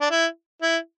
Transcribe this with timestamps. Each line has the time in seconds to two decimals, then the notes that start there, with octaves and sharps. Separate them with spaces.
0.01 D4
0.11 E4
0.62 E4